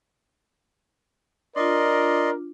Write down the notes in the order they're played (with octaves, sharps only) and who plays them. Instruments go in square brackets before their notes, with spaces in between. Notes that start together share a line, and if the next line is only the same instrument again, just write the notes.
[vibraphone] D4 F4 [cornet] A#4 [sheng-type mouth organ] D5 D#5 C6